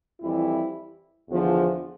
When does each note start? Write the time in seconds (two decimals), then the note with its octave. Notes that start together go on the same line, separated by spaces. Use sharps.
0.21 F2 E3 G3 E4
1.30 E2 D3 F3